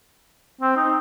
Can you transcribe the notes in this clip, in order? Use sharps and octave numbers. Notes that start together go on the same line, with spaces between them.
C4
D#4